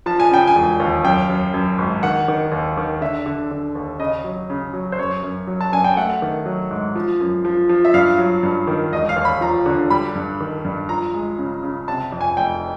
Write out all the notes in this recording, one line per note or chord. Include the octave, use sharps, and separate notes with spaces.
F3 A5
G#5
C#3 G5
G#5
E1
D#2
F#2 G5
F#2
F#2
G#1
D#3 F#5
D#3
D#2
D#3
D3 E5
D3
D3
D#2
C#3 D#5
F#3
C#3
F#3
C5
F#2 C#5
F#2
F#3
A5
F#2 G#5
G5
A3 F#5
D#3
F#3
G#2
F3
F#2
F3
F3
E5
G2 F5
F#3
G2
D#3
E1 D#5
F5
D#2
B5
F3 A#5
D3
G3 B5
G2
D#3
G2
F3 A#5
G#3
C#3
C#3
C3 A5
F2
G#5
F1 G5